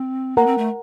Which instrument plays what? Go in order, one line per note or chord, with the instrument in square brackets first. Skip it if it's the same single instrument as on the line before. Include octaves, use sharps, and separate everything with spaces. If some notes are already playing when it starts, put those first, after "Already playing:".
Already playing: [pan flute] C4
[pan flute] A#3 [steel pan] A#4 F#5 A#5
[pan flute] C4
A3